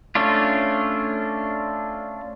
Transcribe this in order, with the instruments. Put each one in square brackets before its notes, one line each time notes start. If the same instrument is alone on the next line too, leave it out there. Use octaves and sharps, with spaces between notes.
[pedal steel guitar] A3 C#4 D4 F4